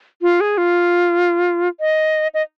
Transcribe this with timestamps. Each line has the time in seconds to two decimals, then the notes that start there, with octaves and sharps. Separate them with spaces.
0.22 F4
0.40 G#4
0.58 F4
1.80 D#5
2.34 D#5